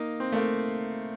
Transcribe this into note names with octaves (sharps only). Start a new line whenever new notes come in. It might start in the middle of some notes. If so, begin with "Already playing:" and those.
Already playing: A#3 D#4
C4
A3
A#3